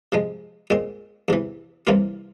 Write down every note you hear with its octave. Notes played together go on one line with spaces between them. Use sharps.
C3 F3 G#3
A#2 G#3 C4
E2 C3 E3
C2 C3 E3 A#3 F4